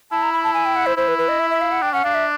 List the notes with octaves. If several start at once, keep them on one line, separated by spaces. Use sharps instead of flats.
E4 A5
A#5
B5
A5
G#5
G5
F#5
C5
E4 C5
B4
B4
D#5
E5
E5
F5
F#5
D4 G5
C#4 F#5
D4 F5
E5